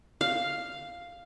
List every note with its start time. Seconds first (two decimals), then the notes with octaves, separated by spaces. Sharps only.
0.21 F5